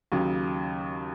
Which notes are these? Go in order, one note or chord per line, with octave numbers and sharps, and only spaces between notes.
D#2 C#3 F#3